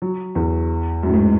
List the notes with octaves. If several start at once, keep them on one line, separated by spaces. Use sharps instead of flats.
F#3
E2
F#2
A2
G#2